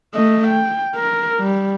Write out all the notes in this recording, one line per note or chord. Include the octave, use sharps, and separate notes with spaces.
A3 D#5
G5
A#4
G3